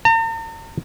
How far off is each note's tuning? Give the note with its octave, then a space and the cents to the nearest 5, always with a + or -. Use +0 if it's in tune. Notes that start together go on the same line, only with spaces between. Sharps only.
A#5 -45